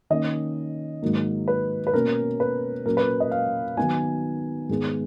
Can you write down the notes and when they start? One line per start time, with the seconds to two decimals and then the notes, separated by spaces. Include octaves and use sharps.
0.10 D#3 A#3 C#4 D#5
1.02 G#2 D#3 F#3 A#3
1.48 B4
1.87 B4
1.94 B2 A#3 C#4 A#4
2.40 B4
2.86 A#2 F#3 C#4 A#4
2.97 B4
3.20 D#5
3.31 F5
3.77 D#3 F#3 B3 D#4 G#5
4.69 G#2 D#3 G#3 B3